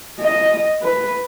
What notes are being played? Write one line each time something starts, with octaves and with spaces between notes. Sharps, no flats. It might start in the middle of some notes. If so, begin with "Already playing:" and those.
D#5
B4